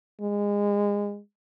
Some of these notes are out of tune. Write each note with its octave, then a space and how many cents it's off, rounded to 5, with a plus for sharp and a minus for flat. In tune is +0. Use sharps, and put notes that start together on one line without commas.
G#3 -25